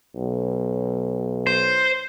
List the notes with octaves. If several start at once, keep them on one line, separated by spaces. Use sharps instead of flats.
B1
C5